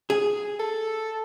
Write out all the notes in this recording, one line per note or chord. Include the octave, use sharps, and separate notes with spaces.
G#4
A4